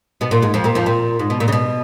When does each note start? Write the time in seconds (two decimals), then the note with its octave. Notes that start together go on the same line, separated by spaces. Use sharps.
0.21 B2 B3
0.31 A#2 A#3
0.42 G#2 G#3
0.54 F2 F3
0.64 A#2 A#3
0.75 F2 F3
0.86 A#2
1.19 G#2
1.30 B2
1.40 A#2
1.48 C#3
1.52 B2